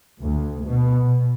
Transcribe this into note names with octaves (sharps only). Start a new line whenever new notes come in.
D2
B2
B2